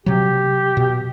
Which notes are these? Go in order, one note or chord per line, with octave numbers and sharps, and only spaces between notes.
C3 F#3 G4
B2